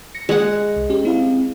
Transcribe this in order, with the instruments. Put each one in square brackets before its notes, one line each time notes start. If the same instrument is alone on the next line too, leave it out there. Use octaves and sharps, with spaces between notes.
[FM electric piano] A#6 C#7
[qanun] G#3 F#5
[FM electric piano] C2
C#4 G4 G#4
C4 E4 F5